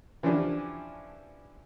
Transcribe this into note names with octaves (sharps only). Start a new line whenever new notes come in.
E3 F3 C#4 D4 G4